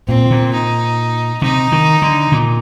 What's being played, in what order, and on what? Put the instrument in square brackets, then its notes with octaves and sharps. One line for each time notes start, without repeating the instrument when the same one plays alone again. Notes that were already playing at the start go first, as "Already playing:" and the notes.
[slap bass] A#2 [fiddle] C4
[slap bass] A#2
[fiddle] D#4
[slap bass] C3 [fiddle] D#4
[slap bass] D#3
D3
A#2